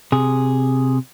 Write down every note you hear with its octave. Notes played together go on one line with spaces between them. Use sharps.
C3 G#4